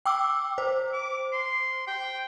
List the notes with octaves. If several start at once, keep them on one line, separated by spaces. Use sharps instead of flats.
G5 D6 E6
C5
D6
C6
G5